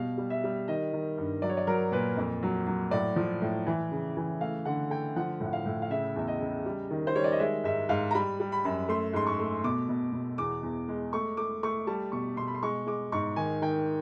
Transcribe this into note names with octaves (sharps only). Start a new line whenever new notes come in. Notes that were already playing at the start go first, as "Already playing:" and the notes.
Already playing: B2 G3 F5
G3
E5
G3
D#3 D#5
D#3
G2
F#3 D5
C#5
D5
F#3 A#4
A#2 B4
F2
F#3
F#3
A2 D5
F3
A2
E3
C#3
E3
A3 F5
D3 F#5
A3 G5
F3 F#5
A2
F#5
F5
A2
F5
C#3 E5
E2 E5
D#5
C#3
G3
D#3
C5
G3 C#5
D5
D#5
G#3 E5
G#2 E5
G#2 F5
A#5
G3 B5
G3
B5
F#2
A3 C6
G#2 C6
C#6
A3
B2 D6
B2
B2
E2 D6
E2
G#3
A3 C#6
A3 D6
A3 C#6
G3 A5
B2 C#6
B2 C6
B5
C6
G#3 C#6
G#3 D6
G#2 C#6
D#3 G#5
D#3 G5